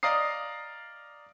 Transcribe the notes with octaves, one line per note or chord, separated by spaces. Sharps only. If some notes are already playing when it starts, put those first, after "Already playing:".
D5 D#5 F5 A#5 D#6 C7